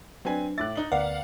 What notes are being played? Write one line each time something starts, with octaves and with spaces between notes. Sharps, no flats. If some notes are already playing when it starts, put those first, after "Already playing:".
F#3 C4 D4 B4 G#5
A2 E5 D6 F#6 A6
D#4 F#7
D2 B3 A#4 D5 F5 F#5